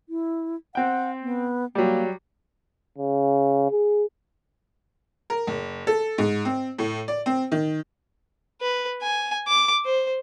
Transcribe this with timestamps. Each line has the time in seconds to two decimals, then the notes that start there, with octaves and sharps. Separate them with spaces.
0.09 E4
0.75 C4 F#5 G5
1.22 B3
1.75 F#3 G3 A#3
2.98 C#3
3.71 G#4
5.30 A#4
5.47 F#1
5.87 A4
6.18 G#2
6.45 C4
6.78 A2
7.08 D5
7.26 C4
7.52 D#3
8.61 B4
9.02 G#5
9.48 D6
9.85 C5